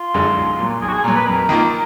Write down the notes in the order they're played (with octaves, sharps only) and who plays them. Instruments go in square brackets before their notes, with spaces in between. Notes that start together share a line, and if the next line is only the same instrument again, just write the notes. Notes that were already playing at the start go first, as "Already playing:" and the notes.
Already playing: [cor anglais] F4
[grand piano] F#2 D3 G#3 D#4
B1
A#2 F#3
[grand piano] B1 [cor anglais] G#4
[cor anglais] F#4
G#4
[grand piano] A#2 F#3 [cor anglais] A#4
[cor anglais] B4
[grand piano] F2 [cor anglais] A#4
[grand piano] D#3 A#3 F4